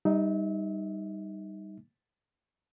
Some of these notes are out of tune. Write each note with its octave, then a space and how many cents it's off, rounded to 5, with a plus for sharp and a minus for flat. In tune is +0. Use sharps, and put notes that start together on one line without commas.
G3 +0 D#4 +0 E5 -30